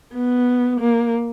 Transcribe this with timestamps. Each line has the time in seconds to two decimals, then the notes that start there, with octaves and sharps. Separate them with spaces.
0.14 B3
0.81 A#3